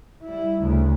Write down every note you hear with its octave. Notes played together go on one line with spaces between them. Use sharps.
G3 E4
D2 C#3